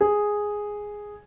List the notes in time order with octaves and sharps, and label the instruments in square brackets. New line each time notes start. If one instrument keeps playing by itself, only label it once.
[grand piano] G#4